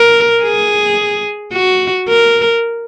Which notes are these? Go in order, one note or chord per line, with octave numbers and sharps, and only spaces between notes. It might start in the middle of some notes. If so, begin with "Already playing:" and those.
Already playing: A#4
G#4
F#4
A#4